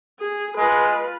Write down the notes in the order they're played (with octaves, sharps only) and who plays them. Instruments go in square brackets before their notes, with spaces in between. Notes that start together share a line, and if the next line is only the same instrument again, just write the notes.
[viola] G#4
[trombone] G#3 [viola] F4 B4